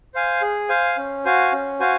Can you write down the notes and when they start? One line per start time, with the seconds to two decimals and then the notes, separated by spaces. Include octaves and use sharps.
0.14 C5 F5 G#5
0.42 G#4
0.69 C5 F5 G#5
0.97 C#4
1.25 F#4 C5 F5 G#5
1.52 C#4
1.80 F#4 C5 F5 G#5